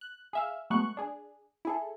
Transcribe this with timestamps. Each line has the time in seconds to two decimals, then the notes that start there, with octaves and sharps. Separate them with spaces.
0.01 F#6
0.33 G#4 E5 F5
0.70 F#3 G#3 A3 B3 C#6 F#6
0.97 D4 G#4
1.65 E4 G#4 A4